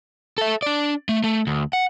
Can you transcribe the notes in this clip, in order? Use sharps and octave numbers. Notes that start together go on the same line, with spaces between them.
A4 E5
D4 D5
A3
A3
D2
F#5